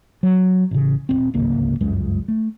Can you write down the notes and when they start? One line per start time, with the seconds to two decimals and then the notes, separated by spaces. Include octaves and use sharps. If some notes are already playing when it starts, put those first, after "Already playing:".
0.23 F#3
0.71 A1 C#3
1.09 D#1 G#1 C4
1.34 D1 G#1 C#2 A#3
1.81 G1 C#2 F#2 G#3
2.28 A3